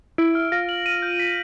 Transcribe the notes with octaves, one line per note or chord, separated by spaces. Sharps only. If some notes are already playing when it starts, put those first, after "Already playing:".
E4 D7
F6
F4 A#6
F#7
D#7
G6
B6